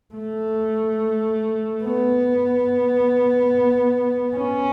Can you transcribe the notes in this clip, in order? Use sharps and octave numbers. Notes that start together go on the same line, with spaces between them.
A3
B3
C#4